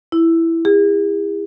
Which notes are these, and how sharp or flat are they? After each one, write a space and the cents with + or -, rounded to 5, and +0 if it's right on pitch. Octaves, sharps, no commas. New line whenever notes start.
E4 +5
G#4 -45